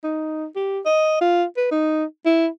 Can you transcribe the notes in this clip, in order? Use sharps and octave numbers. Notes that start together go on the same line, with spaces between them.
D#4
G4
D#5
F4
B4
D#4
E4